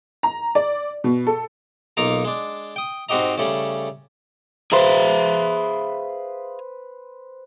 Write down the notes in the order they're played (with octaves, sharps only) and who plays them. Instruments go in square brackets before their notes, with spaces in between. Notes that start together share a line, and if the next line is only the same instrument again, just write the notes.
[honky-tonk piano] A#5
D5
B2
A4
[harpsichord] B1 A#3 D#4 F4 A#4 A#5
G#3 D4
G5 D#6
G#2 C4 F#4 G4 D#5 A#5
C#3 G3 A3 C#4
[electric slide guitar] G#4 E5 F5 [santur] B4 C5